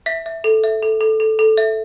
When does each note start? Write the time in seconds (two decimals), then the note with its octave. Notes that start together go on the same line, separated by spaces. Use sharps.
0.06 E5 B6
0.26 E5
0.44 A4
0.64 E5
0.82 A4
1.01 A4
1.20 A4
1.39 A4
1.57 E5